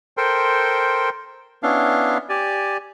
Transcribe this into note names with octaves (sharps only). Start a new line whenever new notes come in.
A4 A#4 C5 G5 C6
B3 C#4 D4 E4 F5
G4 D5 G#5